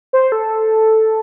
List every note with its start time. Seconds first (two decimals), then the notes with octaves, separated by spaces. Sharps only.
0.13 C5
0.32 A4